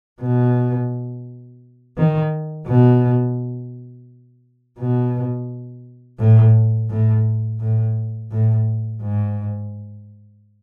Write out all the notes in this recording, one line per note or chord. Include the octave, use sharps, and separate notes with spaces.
B2
D#3
B2
B2
A2
A2
A2
A2
G#2